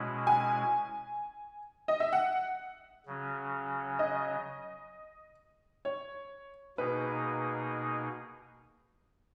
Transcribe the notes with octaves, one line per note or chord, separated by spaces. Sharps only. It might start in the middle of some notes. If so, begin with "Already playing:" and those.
Already playing: B2 G#3 C#4 E4
G#5
D#5
E5
F#5
C#3 F#3 C#4
D#5
C#5
B2 A#3 D#4 G#4 B4